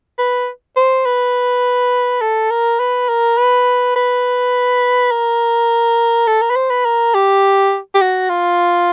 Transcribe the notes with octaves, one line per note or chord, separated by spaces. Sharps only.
B4
C5
B4
A4
A#4
B4
A#4
B4
B4
A#4
A4
A#4
B4
C5
B4
A#4
G4
G4
F#4
F4